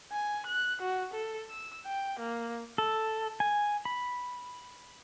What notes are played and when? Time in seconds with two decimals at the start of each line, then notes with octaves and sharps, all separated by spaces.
0.12 G#5
0.46 F#6
0.82 F#4
1.13 A4
1.50 E6
1.86 G5
2.19 A#3
2.78 A4
3.40 G#5
3.85 B5